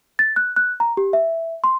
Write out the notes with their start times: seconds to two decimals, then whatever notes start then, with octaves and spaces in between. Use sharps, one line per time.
0.19 A6
0.36 F#6
0.56 F#6
0.80 A#5
0.97 G4
1.13 E5
1.64 C6